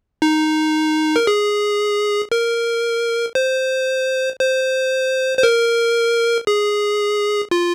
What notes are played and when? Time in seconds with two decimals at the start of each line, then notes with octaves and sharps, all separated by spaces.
0.22 D#4
1.16 A#4
1.27 G#4
2.32 A#4
3.35 C5
4.40 C5
5.38 C5
5.43 A#4
6.47 G#4
7.51 F4